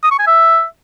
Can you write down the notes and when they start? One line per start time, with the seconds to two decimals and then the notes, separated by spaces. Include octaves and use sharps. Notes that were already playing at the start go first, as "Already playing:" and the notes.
0.03 D#6
0.11 C#6
0.19 G#5
0.27 E5